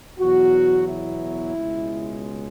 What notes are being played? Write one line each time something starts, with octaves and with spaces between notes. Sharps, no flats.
E2 B2 F#3 F#4
E4
C#2 B2 G#3